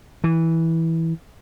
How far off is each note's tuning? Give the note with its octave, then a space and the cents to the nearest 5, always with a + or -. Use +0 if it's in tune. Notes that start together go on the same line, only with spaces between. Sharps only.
E3 -10